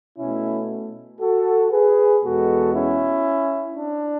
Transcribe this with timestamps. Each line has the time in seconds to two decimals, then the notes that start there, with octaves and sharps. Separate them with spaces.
0.18 B2 A3 C#4 E4
1.21 F#4 A4
1.72 G#4 B4
2.23 E2 B2 G#3 B3 F#4 A4
2.74 C#4 E4
3.76 D4